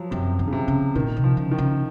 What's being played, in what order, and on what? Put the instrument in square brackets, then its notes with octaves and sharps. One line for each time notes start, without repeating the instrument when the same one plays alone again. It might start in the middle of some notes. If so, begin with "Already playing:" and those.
Already playing: [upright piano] F3 F#3
[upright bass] F#2 [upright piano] C3
[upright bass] D#3
[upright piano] C#3
C3
[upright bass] C#3
[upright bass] A#2 [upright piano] D#3
[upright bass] C3
[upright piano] F3
[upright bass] C#3
[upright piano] D#3
[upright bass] C#3